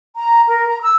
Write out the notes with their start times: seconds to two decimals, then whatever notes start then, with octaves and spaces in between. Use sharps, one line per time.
0.16 A#5
0.48 A#4
0.68 A#5
0.81 E6